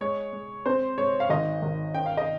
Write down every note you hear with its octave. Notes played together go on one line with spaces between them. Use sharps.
G#3 C#5
G#3
C4 C5
G#3 C#5
F5
G#1 D#5
G#1
C#4 G5
F5
D#5